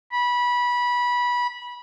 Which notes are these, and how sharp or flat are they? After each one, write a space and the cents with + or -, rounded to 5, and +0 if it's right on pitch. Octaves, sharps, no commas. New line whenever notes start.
B5 -20